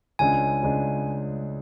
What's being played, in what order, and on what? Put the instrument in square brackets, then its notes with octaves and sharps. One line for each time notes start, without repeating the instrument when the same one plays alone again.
[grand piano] C#2 C#3 G#3 D4 [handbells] G#5
[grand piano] C#2 C#3 G#3 D4